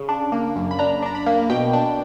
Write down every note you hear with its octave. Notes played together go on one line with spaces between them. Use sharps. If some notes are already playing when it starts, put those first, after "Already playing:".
Already playing: C#3
D4
A#3
F#2
B5
D4 A#5
D4 A#5
B5
A#3
B2 G5
D4